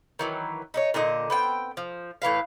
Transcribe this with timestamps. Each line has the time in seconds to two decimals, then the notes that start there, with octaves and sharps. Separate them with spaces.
0.19 D#3 E3 F#3
0.74 D#4 E4 C#5
0.94 A#2 D3 D#4 D#5
1.30 B3 C4 G5
1.77 F3
2.22 A2 E3 B4 F5